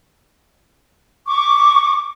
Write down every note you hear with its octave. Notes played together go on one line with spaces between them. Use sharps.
C#6 D6